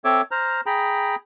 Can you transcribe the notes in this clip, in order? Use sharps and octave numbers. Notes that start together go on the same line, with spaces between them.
C4 A4 C#5 E5 D6
C5 A#5 F6
G#4 G5 A#5 B5